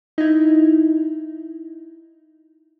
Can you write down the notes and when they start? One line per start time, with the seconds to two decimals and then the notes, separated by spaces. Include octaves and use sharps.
0.18 D#4 E4